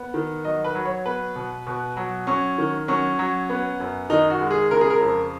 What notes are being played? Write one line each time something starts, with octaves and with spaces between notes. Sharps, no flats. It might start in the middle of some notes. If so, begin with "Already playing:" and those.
Already playing: B3
D#3
F#3 D#5
B4
F#3
C#5
B3 B4
B2
B2
F#3
F#3 C#4
D#3
F#3 C#4
F#3
B3
F#2
D#3 D#4
F#4
G#3
G#4
C#3 A#4
G#4
A#4
F2